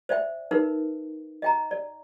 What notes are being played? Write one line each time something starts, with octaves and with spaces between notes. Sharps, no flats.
C5 D5 E5 G5
D#4 A#4 B4
D#5 G5 A#5
D5